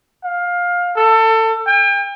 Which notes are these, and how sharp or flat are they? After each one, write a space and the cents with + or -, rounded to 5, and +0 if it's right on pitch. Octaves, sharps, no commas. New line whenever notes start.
F5 +20
A4 +25
G5 +40